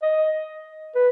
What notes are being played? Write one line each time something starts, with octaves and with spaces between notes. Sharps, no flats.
D#5
B4